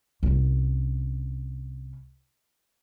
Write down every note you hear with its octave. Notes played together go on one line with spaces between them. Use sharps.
C2 C#4